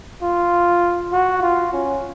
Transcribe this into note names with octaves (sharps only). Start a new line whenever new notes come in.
F4
F#4
F4
C#4